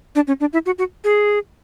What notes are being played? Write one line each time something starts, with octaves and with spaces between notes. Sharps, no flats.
D4
C#4
D4
E4
F#4
F#4
G#4